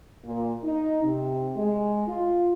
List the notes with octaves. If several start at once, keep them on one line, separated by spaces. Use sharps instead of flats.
A#2
D#4
C3
G#3
F4